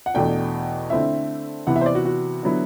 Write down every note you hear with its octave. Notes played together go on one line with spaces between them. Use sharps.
F#5
E2 B2 A3 D4 G5
D3 A3 C4 E4 E5
C3 E3 B3 E4 F#5
E5
C5
D5
F#4
F#4
D3 F#3 B3 E4